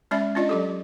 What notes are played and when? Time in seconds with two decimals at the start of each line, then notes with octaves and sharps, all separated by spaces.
0.11 G#3 C#4 D5 E5 B5
0.35 C#4 D4 F4 D5 D#5
0.49 F#3 G4 A4